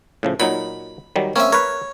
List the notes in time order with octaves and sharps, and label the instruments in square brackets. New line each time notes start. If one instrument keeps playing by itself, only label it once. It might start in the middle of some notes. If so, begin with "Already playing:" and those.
[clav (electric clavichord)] A2 C#3 F3
[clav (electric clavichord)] A#2 F#3 D#4 [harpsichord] B5
[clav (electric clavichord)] D#3 F#3 G3
[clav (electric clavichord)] A#3 C4 [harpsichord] C#4 E5
[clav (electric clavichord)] A#4 B4 [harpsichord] C#5